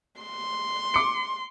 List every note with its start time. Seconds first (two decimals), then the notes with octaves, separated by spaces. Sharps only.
0.21 C6
0.94 D6 C#7